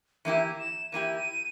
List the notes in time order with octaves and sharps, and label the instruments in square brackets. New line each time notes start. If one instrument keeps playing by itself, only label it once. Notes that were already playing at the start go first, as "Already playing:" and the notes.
[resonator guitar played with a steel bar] E3 A#3 E4 G4 [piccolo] D#7
[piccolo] E7
[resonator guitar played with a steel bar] E3 A#3 E4 G4 [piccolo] D#7